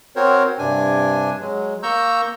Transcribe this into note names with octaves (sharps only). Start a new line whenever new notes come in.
C4 F#4 A#4 C5 C#5
G2 C3 D4 G#5
F#3 G#3
A#3 A#5 C#6 E6 G6